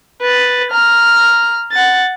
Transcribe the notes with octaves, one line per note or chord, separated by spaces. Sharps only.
B4 A6
A#5 F6
F#5 A6